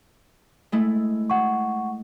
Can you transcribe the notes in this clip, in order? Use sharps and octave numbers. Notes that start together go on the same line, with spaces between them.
G#3 A3 E4
F#5 C#6